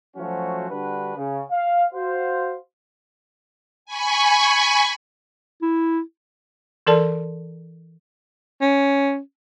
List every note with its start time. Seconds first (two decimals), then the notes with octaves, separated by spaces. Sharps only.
0.16 F3 F#3 A3 C#4 F#4 C5
0.70 D3 G3 D4 F#4 B4
1.16 C#3
1.51 F5
1.94 F#4 C5 F5
3.85 G#5 B5 C#6
5.62 E4
6.87 E3 A4 A#4 D5 A5
8.61 C#4